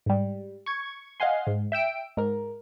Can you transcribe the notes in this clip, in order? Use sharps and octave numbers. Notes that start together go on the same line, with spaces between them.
G#2 G3
C#6 G#6
D#5 F5 F#5 G#5 C6
G#2
E5 G5 E6 D7
G#2 A#4